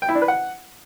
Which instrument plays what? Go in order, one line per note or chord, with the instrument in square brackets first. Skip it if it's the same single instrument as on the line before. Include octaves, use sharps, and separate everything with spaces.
[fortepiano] G5
E4
D4
B4
F#5